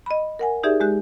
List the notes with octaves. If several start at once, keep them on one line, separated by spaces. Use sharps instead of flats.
D#5 B5
A#4 F#5 G#5
D#4 G4 G#4 D5 E5
G#3 G4 F#6